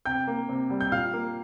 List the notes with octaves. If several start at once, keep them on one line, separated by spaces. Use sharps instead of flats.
C3 G5 G6
A#3
C3
G3
G6
A#2 F5 F6
A#3